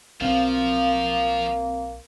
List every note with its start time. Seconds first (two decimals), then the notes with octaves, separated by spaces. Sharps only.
0.21 B1 F3 A#3 C4 F5